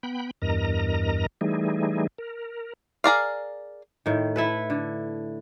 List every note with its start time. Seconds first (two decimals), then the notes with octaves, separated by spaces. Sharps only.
0.03 B3 G5 B5
0.42 E2 G2 A#4 D#5 A#5
1.41 E3 G3 A3 D#4 G#4
2.18 A#4
3.04 G#4 A#4 D5 F5
4.06 A2 D#3
4.36 E4 A4 B4
4.70 D3